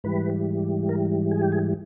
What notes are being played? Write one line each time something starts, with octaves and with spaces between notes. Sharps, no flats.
G#2 E3 G3 B4
A#4
G#4
G4
G#4